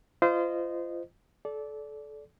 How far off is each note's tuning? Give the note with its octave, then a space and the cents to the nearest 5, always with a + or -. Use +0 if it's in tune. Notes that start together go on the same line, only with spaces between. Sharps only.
F4 -25 C5 -25 D#5 -15
A4 -25 D5 -15